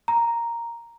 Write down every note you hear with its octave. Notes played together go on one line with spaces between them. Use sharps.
A#5